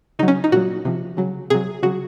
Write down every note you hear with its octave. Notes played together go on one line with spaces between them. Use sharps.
C#3 F#3 D#4
C#4
D#4
A#2 F#3 F#4
C3 F3
C#3 F#3
C3 F#3 G#4
C#3 F#3 F#4